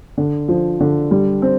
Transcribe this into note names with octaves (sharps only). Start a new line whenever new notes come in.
D3
F3
D3
G3
C4